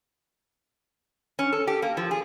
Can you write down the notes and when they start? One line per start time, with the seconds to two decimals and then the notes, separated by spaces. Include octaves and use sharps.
1.39 C#4
1.53 A4
1.67 G4
1.82 A#3
1.97 F3
2.11 G#4